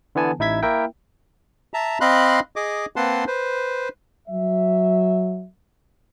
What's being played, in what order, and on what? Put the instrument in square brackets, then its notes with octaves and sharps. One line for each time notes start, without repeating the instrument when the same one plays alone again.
[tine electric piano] D3 E3 B3 G#5 A5
A1 D#4 E4 E5 G#6 B6
A#3 E4 A#4 E5 G5
[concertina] E5 A5 A#5
C4 D#5 F5 B5 C6 F#6
G#4 D#5 D6
A#3 C4 B4 F#5 A5 C6
B4 C5
[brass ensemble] F#3 E5